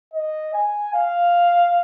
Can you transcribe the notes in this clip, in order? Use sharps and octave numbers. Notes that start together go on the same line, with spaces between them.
D#5
G#5
F5